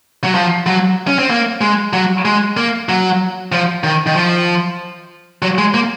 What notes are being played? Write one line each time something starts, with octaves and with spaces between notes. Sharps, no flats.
F#3
F3
F#3
C#4
C4
A#3
G#3
F#3
G#3
A#3
F#3
F3
D#3
D#3
F3
F#3
G#3
A#3